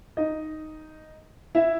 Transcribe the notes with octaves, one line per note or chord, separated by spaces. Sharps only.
D#4 D#5
E4 E5